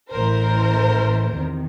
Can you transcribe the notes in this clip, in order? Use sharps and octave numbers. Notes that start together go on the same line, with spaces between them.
A1 A2 E3 A#4 C5
E2 C3 D#3